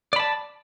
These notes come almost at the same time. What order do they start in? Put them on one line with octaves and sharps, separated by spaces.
D5 B5 A5